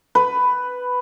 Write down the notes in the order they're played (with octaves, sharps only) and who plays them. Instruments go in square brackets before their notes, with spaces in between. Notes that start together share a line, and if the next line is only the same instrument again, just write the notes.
[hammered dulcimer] B4